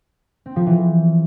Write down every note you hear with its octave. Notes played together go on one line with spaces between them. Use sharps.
C4
F3
E3